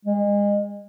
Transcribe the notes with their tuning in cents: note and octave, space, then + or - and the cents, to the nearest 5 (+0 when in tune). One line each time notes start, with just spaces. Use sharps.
G#3 -30